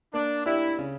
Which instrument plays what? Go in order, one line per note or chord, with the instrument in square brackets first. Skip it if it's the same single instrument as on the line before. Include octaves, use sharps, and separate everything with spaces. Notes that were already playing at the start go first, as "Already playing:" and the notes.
[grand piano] A#3 [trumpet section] D4
[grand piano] D4 G4 D5 [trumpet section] E4
[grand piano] C#3